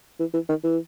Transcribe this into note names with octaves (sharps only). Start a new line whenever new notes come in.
E3
E3
D#3
E3